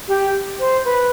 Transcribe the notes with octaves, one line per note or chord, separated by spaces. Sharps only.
G4
C5
B4